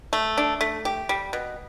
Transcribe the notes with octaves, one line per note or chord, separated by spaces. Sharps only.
A3
D4
A3
G4
G3
B2